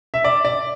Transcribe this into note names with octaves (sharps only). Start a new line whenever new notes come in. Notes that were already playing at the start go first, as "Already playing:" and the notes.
E5
D5
D5